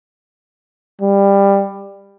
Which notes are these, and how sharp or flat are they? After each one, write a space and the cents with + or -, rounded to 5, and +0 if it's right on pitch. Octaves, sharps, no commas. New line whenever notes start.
G3 +15